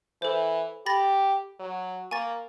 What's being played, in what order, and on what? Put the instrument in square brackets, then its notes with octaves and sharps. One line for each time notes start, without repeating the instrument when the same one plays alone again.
[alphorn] E3 [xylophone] A4 C5
[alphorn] G4 [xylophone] B5 A6 A#6
[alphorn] F#3
[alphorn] A#3 [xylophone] G#5 C#6 A6